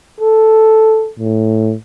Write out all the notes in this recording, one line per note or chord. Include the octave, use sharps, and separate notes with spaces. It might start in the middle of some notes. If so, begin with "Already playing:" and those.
A4
A2